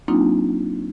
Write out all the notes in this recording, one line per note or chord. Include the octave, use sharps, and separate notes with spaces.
F#3 A#3 C4 D4 D#4 F4